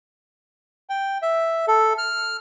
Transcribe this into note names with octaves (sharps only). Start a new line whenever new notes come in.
G5
E5
A4
F6